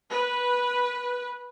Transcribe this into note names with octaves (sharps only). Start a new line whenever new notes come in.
B4